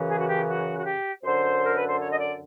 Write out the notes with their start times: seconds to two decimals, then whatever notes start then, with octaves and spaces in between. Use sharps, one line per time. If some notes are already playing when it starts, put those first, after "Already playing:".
Already playing: F#2 C#3 E3
0.09 G#4
0.18 F#4
0.28 G4
0.48 F#4
0.79 F#4
0.86 G4
1.24 F#2 D3 C5
1.66 A#4
1.77 B4
1.89 C5
2.00 C#5
2.13 D#5
2.19 D5